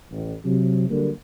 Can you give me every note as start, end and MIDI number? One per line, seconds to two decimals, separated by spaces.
0.11 0.33 33
0.45 0.87 48
0.45 0.87 54
0.89 1.09 50
0.89 1.09 54
0.89 1.09 55
0.89 1.09 58